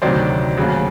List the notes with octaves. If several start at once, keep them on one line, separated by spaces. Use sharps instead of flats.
D2 C3 D#3 F#3 C5 D5
D#2 C#3 F#3